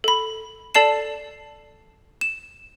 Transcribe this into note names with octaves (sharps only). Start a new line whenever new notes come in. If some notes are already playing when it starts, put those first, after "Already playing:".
A4 B5
A4 D5 A5 C7 E7
E7